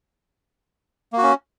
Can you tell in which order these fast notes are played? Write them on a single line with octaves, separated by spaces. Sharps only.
A#3 F#4 C#4